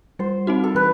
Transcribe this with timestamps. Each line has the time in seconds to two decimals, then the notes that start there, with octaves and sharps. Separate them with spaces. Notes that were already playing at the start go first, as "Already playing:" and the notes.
0.19 G3 C5
0.47 C4 D#4 F#4
0.64 A4
0.75 E3 B4